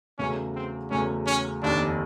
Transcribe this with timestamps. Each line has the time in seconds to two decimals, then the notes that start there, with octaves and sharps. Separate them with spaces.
0.19 E2 C#3 F#3 A3 C#4
0.55 C4
0.91 E2 C#3 F#3 A3 C#4
1.26 C#4
1.62 F1 D#2 D#3 D4